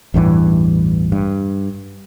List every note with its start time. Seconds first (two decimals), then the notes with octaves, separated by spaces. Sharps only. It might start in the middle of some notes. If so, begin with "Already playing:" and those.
0.14 A1 E2 G2 E3
1.12 G2